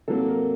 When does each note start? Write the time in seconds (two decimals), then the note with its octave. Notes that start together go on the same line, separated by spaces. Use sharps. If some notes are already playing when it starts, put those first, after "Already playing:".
0.08 C3 F#3 A#3 A4
0.28 A#4